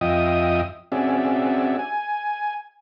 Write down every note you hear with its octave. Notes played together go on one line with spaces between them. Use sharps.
F2 F4 D#5 E5 G5 D#6
C4 C#4 F#4 G#4 D5 E5
G#5